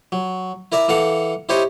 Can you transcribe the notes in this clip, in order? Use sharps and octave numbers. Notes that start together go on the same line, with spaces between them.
F#3
E4 A#4 D5 E5
E3 A4 F5 F#5 D6
E4 G4 C5 C#5 D#5